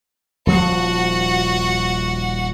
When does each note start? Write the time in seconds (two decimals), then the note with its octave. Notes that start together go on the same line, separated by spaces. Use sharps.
0.47 D#1 F3 C4 F#4 F#5